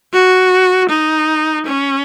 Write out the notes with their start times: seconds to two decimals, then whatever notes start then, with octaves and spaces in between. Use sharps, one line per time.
0.13 F#4
0.89 D#4
1.66 C#4